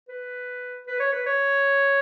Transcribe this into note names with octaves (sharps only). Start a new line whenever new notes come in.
B4
B4
C#5
B4
C#5